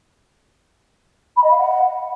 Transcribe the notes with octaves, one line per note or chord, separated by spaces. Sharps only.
B5
D#5
F5
F#5